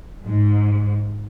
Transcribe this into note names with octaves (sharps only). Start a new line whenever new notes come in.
G#2